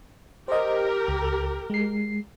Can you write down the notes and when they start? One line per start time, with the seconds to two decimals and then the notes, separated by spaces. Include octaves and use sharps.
0.48 G4 A#4 C5 D#5
1.08 C#2
1.70 G#3 C7